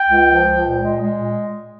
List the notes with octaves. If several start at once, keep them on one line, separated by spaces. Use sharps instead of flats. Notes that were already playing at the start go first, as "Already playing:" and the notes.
Already playing: G5
C#2
F3
C#2
A#2
G#3
G#3
A#2